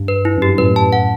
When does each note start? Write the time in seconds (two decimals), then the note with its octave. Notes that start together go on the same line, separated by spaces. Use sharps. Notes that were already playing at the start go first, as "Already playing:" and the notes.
Already playing: G2
0.08 B4
0.25 E4
0.38 F#2 G4
0.49 G2
0.58 F#2 A2 B4
0.76 A5
0.93 F#5